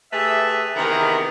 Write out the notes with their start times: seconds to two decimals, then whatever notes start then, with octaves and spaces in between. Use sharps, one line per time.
0.12 A3 G4 G#4 B4 E5
0.76 C3 D#3 E3 B3 G#4 A#4